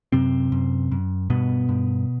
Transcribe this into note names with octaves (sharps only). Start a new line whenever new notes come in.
F#2 C3 C4
F#2
F#2
G2 B2 B3
G2